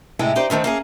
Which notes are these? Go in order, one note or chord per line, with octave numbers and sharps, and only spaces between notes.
A2 C3 G#3 E4 G5
D#4 G4 C5 D5
D3 D#3 A3 C4
A#3 C#4 G#4